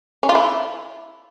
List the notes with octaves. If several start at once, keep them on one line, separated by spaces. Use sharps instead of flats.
C#4
F4
E4